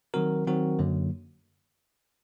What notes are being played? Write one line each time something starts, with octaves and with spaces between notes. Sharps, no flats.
D#3 F#3 C4 F#4 A#4
D#3 F#3 C4 F#4 A#4
F#2 D3 F#3 A#3